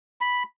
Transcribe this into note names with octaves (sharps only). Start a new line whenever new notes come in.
B5